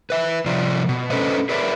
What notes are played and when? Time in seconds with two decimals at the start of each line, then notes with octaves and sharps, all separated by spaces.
0.10 B4 E5
0.46 C3 F3 F4 D5
0.89 B2
1.10 C#4 D4 A4 B4 C5 D#5
1.49 G#4 A#4 B4 D5 E5